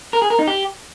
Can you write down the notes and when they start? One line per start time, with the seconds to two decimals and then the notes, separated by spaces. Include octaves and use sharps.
0.13 A#4
0.22 G#4
0.30 A#4
0.39 D#4
0.47 G4